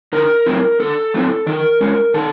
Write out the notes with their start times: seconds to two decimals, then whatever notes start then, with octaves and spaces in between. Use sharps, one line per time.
0.13 D3 A#4
0.46 F#3 A3 C4 E4
0.80 D3 A4
1.14 F#3 A3 C4 E4
1.46 D#3 A#4
1.81 G#3 C#4
2.14 D#3 A4